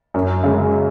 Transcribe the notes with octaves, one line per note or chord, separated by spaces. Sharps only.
F#2
C#3 G#3